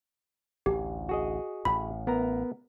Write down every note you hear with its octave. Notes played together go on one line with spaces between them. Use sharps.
A1 D2 G4
F#4 G#4 D#5
A1 A2 B5
B3 A#4 A#5